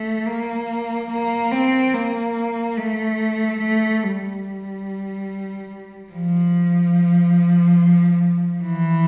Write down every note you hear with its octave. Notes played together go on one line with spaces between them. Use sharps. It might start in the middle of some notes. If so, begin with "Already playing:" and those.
Already playing: A3
A#3
A#3
C4
A#3
A3
A3
G3
F3
E3